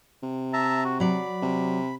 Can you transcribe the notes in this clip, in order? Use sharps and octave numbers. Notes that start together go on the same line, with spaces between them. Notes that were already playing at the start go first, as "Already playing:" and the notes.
C3
E5 A5 A#5
F#4
F#3 D5 B5
C3